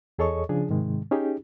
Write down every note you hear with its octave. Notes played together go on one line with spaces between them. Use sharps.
E2 G#4 A4 C#5 D#5 C#6
C#3 F3 D4 G#4
G#2 C3 D#3 G#3
C#4 D#4 G4 G#4